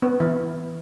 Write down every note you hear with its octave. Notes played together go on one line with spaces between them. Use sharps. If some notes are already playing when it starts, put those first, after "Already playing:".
B3
E3